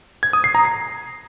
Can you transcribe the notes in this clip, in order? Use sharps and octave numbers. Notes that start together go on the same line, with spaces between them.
G#6
D#6
C7
A#5
C7